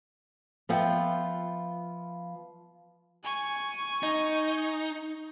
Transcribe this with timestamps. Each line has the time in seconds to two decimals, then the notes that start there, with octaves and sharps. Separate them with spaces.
0.69 F3 B3 F4 E5 F#5 G5
3.24 G#5 C#6
4.03 D#4